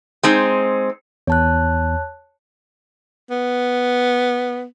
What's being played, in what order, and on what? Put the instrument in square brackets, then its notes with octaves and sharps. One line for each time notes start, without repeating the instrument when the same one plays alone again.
[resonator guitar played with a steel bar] G#3 C4 D#4
[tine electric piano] E2 [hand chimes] C#5 A5 F#6
[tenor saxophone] B3